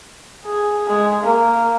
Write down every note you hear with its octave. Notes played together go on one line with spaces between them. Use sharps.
G#4
G#3 G#4
A#3